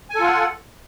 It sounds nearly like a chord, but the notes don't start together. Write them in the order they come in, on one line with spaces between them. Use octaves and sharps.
G#5 A4 F4 F#5